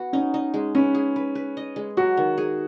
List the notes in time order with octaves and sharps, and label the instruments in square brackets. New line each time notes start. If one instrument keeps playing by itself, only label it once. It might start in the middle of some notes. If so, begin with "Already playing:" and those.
Already playing: [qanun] B3 F#4
[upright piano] C#4 [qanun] D#4
[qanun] D#4
G#3
[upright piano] C#4 [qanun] B4
[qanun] G#4
B4
B4
D#5
G#3
[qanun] F#3 [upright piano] F#4
[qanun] D#3
G#4